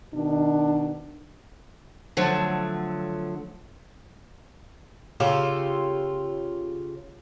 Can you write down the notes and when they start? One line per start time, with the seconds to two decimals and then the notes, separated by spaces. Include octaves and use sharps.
0.13 B2 D#3 D4
2.17 D3 F3 F#3 A3
5.20 C#3 F4 G4 A4